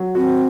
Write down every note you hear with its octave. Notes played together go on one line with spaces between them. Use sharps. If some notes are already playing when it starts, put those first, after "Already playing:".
Already playing: F#3
C4 F#4